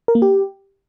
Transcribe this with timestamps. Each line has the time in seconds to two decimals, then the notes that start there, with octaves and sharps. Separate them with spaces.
0.08 A#4
0.15 A#3
0.22 G4